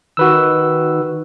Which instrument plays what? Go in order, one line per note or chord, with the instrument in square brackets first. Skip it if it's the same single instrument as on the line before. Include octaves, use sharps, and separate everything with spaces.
[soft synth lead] D#3 [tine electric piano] F#4 B4 E6